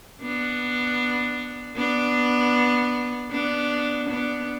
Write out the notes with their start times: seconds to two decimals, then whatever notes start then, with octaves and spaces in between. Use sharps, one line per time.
0.22 B3 D4
1.76 B3 D4
3.31 B3 D4
4.09 B3 D4